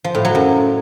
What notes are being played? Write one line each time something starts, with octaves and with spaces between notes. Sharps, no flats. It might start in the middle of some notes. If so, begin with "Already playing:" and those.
F3
A2
F#3
F#2